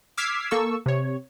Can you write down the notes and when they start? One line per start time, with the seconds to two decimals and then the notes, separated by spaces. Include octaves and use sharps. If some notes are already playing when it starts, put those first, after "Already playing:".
0.17 D6 E6 F6 G#6 B6 C7
0.51 A#3 A4 C#6 E6
0.86 C3 C#5